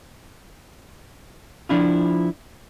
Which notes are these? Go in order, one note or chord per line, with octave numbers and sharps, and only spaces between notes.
F3 D4 E4 F4